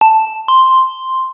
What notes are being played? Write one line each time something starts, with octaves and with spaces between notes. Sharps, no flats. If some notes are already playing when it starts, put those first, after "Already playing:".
A5
C6